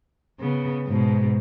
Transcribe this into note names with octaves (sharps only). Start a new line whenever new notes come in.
C#3 B3
G#2 B2